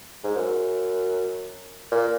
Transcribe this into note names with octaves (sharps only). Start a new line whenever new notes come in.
G#2
F#2
A#2